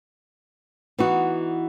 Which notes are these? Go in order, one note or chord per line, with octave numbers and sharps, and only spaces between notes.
E3 B3 D#4 F#4